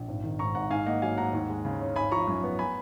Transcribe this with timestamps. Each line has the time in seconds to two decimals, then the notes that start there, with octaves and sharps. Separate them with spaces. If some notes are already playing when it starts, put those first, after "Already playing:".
Already playing: A#1
0.08 G#1
0.23 D#3
0.39 G#2 A#5 C#6
0.55 G#1 F#5 A#5
0.70 G#2 F5 G#5
0.86 A#3 D#5 F#5
1.02 F#3 F5 G#5
1.17 G#2 F#5 A#5
1.33 D#2
1.49 G#3
1.65 C#3
1.81 C#4
1.96 G#1 G#5 B5
2.12 F3 A#5 C#6
2.28 F#2
2.43 B3
2.59 G#5 B5